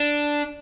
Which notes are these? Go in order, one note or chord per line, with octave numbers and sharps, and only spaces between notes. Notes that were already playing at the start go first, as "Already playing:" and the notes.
Already playing: D4